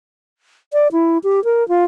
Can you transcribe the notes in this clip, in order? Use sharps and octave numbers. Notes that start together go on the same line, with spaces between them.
D5
E4
G4
A#4
F4